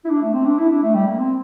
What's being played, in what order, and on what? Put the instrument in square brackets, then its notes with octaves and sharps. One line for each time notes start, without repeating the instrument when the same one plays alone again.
[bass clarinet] E4
D4
A3
C4
D4
E4
D4
A3
G3
A#3
C4